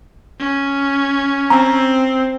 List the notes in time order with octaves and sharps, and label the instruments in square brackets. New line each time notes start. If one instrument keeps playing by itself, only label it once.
[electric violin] C#4
[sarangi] C4 [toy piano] A#5